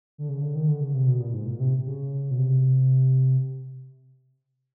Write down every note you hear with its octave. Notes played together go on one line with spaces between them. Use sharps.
D3
C#3
D3
D#3
D3
C#3
C3
B2
A#2
G#2
A#2
C3
C#3
B2
C3